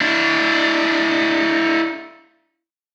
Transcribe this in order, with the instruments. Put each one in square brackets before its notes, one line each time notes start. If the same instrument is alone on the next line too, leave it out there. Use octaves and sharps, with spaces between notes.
[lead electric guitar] D4 E4